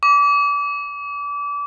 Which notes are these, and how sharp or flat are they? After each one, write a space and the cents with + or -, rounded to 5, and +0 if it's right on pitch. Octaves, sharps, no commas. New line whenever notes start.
D6 -30